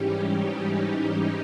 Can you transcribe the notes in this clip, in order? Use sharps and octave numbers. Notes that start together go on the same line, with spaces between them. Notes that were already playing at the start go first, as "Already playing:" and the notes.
Already playing: G#2 E3 G3 C#4 G4
D#4